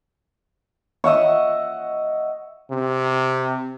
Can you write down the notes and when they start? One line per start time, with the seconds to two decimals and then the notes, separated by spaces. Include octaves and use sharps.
1.04 D#5 E5 F#5 C#6
2.71 C3